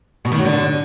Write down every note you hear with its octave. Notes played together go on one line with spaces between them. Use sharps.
B2
D#3
F#3
D3